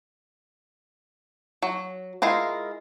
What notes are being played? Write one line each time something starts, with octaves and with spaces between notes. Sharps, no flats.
F#3
G#3 E4 F4 A#4